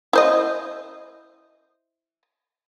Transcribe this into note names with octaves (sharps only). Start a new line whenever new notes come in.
E4 C5 D#5